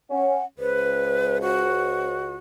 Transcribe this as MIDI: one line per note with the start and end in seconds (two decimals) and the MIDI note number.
0.10 0.41 61
0.10 0.45 78
0.59 2.37 37
0.59 1.37 71
0.59 2.16 72
1.42 2.36 66